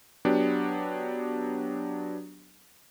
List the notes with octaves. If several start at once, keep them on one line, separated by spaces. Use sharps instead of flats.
F#3 B3 D4 G4